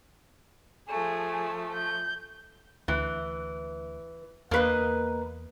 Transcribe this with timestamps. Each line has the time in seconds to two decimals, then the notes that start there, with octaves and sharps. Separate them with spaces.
0.89 F3 A3 G#4
1.74 G6
2.88 D2 E3
4.51 E2 A#3 B4 D#5